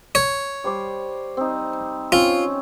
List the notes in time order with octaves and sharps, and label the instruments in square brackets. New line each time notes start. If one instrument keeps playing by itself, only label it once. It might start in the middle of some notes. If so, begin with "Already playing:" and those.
[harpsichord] C#5
[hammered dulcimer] G3 C5 D6
C4 D#4
[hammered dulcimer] C4 C#4 [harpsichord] F4